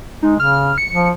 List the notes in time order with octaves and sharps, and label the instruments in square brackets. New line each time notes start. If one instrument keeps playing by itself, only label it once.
[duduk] G#3 [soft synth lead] D#4
[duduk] C#3 [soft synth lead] F6
[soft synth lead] C#7
[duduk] F3